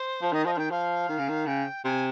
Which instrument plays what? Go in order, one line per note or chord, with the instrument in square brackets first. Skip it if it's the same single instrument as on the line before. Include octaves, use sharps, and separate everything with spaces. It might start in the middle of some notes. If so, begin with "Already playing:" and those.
Already playing: [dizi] C5
[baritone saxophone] F3
[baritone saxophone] D#3 [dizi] D#5
[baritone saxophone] F3 [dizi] D#5
[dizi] F5
[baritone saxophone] D#3 [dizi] G5
[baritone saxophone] F3 [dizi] F5
[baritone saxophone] D#3
C#3
D#3
[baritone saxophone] C#3 [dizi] G5
[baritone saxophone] C3 [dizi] G#5